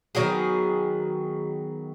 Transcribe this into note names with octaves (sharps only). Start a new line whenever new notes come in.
D#3 F#3 B3 G#4